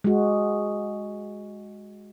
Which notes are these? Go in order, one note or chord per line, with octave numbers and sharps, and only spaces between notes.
G#3 F#4